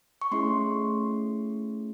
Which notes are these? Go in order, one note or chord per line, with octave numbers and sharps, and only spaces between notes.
C#6
A3 C#4 E4 G#4 C6